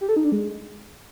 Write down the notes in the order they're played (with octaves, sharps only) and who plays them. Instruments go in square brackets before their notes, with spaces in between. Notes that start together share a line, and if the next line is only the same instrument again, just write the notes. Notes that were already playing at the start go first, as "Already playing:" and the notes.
[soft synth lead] G4
A4
D#4
D4
G#3